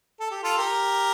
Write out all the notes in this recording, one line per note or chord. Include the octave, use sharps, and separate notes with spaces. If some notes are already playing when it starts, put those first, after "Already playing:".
A4
G4
F4 A4
G4 A#4